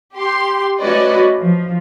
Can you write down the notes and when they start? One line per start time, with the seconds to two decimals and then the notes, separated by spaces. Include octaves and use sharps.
0.15 G4 C6
0.80 A3 C#4 F#4 B4 D5 D#5
1.40 F3